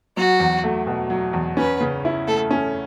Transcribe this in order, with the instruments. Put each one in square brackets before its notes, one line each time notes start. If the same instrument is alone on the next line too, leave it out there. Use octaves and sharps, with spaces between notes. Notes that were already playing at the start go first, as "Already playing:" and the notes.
[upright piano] F#3 [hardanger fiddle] F#4
[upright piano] E2
A3
B2
F#3
E2
[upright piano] C#4 [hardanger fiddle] B4
[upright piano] C#3
E4
[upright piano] A3 [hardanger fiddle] A4
[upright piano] C#4